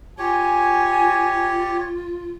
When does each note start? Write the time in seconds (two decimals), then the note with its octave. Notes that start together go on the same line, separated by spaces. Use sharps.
0.18 F4 G4 C#5 G#5